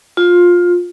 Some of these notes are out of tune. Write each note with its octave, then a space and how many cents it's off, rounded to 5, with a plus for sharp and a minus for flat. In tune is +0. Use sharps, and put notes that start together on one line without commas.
F4 +15